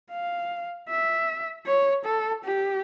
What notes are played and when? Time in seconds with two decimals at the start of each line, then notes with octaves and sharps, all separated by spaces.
0.12 F5
0.89 E5
1.66 C#5
2.05 A4
2.44 G4